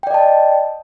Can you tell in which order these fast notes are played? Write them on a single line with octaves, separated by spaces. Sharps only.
G5 D5 D#5 A5